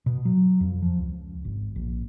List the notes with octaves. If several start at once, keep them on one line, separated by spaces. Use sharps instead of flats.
B2
F#3
F2
F3
C#2
G#1
A#1